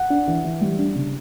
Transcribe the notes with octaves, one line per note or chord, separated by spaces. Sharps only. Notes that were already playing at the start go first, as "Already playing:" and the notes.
Already playing: F#5
D4
E3
E3
G3
D4
C#3